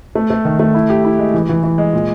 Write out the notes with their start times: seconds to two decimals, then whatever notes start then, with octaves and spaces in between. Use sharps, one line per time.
0.15 A3
0.30 A3
0.45 D#3
0.60 A3
0.75 E4
0.90 G4
1.05 E4
1.19 G#3
1.34 E3
1.49 E3
1.63 E3
1.78 G#3
1.93 A#2